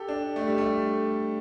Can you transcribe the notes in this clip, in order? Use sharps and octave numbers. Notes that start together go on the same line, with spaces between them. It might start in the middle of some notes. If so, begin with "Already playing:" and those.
Already playing: G4 A4
D4
A3
G3
A3